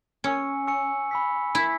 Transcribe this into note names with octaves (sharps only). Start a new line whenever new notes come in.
C#4 G#5 C#6 E6 C#7
G#5 C#6 E6 C#7
B5 E6 B6
E4 B5 E6 B6